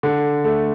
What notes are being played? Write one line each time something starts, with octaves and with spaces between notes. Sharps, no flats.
D3
A3